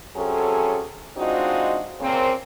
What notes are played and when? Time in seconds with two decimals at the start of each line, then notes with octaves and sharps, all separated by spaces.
0.16 C3 F#3 C#4 G#4 A4
1.17 G#3 C4 D4 D#4 F4 F#4
2.00 A#2 C#3 A#3 C4